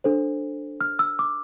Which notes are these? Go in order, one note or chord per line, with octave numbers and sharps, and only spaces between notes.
D4 A4 C5
F6
E6
D6